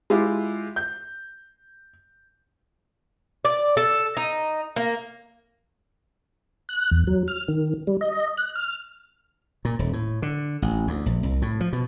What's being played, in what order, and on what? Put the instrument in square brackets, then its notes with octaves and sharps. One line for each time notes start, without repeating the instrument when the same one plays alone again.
[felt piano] G#3 E4 F4 G4
G6
[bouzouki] D5
A4
D#4
A#3
[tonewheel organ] F#6
E2
F#3
F6
D#3
G3
D#5
F#6
F6
[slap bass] A#2
D#1
A2
D3
A1
D2
A#1
C2
A2
F3
B2